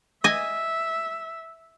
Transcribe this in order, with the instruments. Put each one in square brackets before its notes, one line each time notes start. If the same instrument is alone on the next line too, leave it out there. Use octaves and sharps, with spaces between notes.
[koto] D#5 G#5 [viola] E5